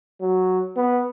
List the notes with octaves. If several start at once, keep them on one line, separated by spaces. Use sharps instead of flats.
F#3
B3